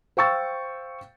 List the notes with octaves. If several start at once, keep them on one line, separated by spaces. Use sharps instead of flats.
C5 F5 G5 C#6 E6 A6